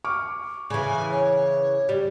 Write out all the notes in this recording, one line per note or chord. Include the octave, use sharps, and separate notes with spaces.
C#6 D6 F6
C#3 E3 G#5
C#5
G3